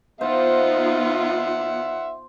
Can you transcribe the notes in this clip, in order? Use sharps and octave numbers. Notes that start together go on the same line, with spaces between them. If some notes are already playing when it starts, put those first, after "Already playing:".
B3 D#4 F4 C5 E5 F#5